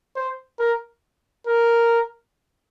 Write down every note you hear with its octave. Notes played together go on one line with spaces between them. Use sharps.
C5
A#4
A#4